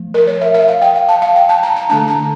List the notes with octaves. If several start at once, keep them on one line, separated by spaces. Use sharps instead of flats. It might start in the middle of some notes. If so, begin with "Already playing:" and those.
Already playing: F3 A3
A#4
C#5
E5
E5
F5
G5
F5
A5
F5
G5
A5
A#5
A#5
D3 A3 D4 A5
A#5